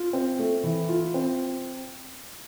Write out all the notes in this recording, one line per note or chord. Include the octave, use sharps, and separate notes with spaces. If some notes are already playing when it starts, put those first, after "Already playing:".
Already playing: F4
C4
A3
E3
F4
C4